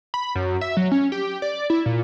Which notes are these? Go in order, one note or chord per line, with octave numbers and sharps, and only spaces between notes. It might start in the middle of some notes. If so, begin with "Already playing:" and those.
B5
F#2
E5
F#3
C#4
G4
D5
E4
A#2